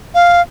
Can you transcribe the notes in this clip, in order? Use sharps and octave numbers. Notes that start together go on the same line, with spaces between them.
F5